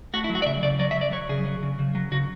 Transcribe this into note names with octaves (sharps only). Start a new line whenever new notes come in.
A3 F#4
E4
F#3
F#4
D5
C#3 E5
C#3 D5
F#3 D5
E5
F#3
D5
F#3 C#5
C#3 G#4
F#3
C#3
C#3
F#3
C#3 F#4